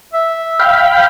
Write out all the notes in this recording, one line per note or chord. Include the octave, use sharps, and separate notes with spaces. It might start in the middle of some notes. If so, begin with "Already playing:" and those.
E5
F5 G5 B5